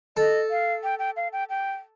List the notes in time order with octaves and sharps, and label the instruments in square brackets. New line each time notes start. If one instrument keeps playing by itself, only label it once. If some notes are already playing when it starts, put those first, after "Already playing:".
[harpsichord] A4 [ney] D#5
[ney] F5
G5
G5
F5
G5
G5